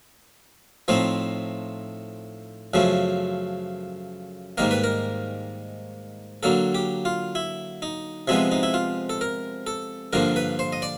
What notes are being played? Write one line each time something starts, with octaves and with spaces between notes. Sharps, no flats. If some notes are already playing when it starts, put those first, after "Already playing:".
A2 F3 A3 C4 D#4 C5
F#2 C#3 F3 A3
G#2 D#3 G3 A#3 A#4
B4
A#4
D3 F#3 A#3 A4
G4
F4
E4
D#4
C3 F3 G#3 B3 E4
D#4
E4
F4
A4
A#4
A4
G2 D3 F3 A#3 A#4
B4
C5
D#5
D5